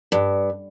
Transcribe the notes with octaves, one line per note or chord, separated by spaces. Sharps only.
G2